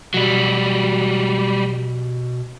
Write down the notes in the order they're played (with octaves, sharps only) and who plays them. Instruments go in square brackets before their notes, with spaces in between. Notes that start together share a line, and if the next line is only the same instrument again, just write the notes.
[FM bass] B2 [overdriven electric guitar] F#3 G3